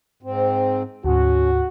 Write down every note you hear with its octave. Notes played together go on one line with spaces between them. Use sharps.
G#2 C4
D2 G#2 C#4 F#4